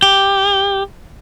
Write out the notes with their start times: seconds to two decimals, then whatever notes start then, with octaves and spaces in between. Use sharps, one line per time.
0.02 G4